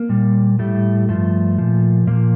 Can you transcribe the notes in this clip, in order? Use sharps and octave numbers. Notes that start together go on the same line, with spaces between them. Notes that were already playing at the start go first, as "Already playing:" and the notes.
Already playing: A#3
A#2 G3
A2 G3 A3
G2 F3 A3
A#2 F3
A#2 F3 A#3